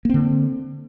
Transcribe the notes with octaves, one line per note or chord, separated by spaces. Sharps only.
D3 A#3 C4